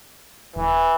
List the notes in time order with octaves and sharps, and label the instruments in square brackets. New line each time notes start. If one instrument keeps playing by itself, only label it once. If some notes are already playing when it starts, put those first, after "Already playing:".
[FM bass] D#1 [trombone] E3